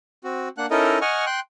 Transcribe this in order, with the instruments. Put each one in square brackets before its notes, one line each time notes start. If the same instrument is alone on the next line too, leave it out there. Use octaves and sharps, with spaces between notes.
[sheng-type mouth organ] C4 F#4
A#3 D4 F#5 F#6
C#4 D#4 E4 A4 A#4 D#5
D#5 F#5 G#5 C#6 F6
G5 C6 F#6